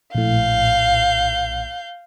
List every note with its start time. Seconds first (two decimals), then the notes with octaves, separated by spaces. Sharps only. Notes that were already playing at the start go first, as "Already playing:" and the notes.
0.15 A#1 A2 F5 G6